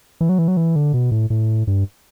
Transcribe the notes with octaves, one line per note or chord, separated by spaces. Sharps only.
E3
F#3
E3
F#3
E3
D3
B2
A2
A2
G2